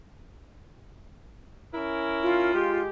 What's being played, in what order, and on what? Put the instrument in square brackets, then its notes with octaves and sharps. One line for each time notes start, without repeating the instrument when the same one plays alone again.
[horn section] C#4 E4 A#4
[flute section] F4
[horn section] G#3 G4